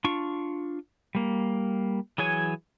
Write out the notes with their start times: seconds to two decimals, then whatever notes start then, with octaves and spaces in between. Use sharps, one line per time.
0.04 D4 F4 C#6
1.15 G3 A#3
2.18 E3 F#3 G#4 C#5 G#5